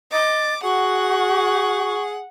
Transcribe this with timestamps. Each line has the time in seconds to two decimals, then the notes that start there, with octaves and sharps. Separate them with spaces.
0.12 D#5 D6 A6
0.63 F#4 G#4 F#5 C#6